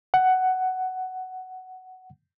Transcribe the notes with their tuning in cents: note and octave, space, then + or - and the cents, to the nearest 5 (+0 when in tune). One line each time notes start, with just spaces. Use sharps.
F#5 +10